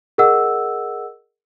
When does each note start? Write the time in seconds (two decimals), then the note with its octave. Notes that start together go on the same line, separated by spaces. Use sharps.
0.18 G#4 A#4 D#5 F#5 E6